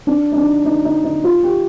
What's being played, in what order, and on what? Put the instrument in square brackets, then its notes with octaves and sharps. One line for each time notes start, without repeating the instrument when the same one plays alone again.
[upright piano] D4
D#4
D4
D#4
D#4
D#4
F4
G4